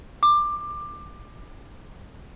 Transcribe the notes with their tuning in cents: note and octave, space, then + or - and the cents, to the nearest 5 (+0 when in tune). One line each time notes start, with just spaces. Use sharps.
D6 +15